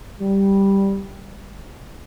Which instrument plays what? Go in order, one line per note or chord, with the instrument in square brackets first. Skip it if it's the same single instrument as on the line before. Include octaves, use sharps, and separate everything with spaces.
[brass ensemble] G3